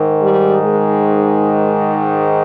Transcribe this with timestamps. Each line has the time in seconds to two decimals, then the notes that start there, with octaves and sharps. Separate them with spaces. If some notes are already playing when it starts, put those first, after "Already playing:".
Already playing: G#2 D#3
0.21 G3
0.63 G#3